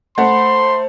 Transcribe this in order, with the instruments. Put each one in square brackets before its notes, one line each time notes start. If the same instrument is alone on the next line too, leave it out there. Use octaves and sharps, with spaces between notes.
[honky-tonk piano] A3 [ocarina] C5 [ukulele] F#5 B5 [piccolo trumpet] C6